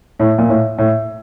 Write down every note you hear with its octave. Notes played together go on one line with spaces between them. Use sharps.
A2
A#2
A2
A2